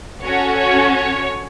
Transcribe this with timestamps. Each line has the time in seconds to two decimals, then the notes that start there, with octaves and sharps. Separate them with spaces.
0.24 C#4 F#4 A4 C#5
0.58 C#5
0.93 C#5